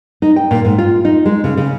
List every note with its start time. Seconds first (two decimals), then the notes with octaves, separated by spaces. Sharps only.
0.22 D#4
0.36 G5
0.51 A#2
0.65 G#2
0.78 F4
1.05 D#4
1.26 G#3
1.44 C#3
1.58 C#3